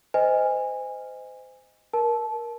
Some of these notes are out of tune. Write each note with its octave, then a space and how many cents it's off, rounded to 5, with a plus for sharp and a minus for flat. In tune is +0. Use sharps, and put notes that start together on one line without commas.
C5 -30 D#5 +5 G#5 -20
A#4 +20 A5 -25